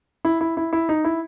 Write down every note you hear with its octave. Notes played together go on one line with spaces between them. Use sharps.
E4
E4
E4
E4
D#4
E4